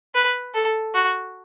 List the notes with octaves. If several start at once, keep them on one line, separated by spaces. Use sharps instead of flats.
B4
A4
F#4